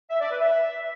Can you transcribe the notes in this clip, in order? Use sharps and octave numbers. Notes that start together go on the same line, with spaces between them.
E5
D5
B4
E5